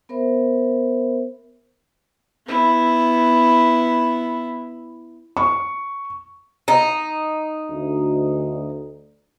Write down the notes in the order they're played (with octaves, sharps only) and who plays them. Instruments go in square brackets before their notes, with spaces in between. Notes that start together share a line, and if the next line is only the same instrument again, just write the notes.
[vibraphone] B3 A#4 C5 E5
[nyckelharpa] B3 E4
[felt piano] C#6
[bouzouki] D#4
[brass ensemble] D2